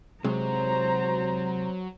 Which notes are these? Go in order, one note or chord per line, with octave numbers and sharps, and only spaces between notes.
C3 F#3 G#3 C5 A#5